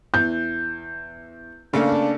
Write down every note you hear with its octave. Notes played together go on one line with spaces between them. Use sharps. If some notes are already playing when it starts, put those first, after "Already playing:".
E2 G6
C#3 A3 A#3 D4